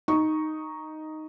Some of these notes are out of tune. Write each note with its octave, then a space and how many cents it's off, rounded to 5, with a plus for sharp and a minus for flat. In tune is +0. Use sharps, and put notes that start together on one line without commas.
D#4 +0 C#6 +0